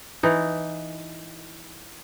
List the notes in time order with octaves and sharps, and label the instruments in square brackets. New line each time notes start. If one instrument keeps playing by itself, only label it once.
[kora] E3 D#4